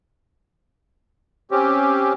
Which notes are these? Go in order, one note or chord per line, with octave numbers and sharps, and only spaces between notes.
C4 C#4 G4